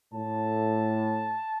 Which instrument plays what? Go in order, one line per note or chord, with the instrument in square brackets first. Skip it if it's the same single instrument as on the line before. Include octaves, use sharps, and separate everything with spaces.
[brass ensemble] A2 [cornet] A5